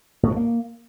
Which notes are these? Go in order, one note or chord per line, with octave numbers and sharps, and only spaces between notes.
A2
F3
A#3